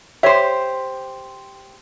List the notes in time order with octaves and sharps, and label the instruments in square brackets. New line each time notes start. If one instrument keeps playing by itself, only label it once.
[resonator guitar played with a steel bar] G4 C5 [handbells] C#5 E5